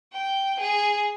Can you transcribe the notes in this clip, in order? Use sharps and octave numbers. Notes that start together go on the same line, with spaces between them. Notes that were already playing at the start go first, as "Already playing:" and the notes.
G5
G#4